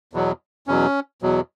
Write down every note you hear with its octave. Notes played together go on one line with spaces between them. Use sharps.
E2 B2 F#3
E2 B2 F#3 C#4
E2 B2 F#3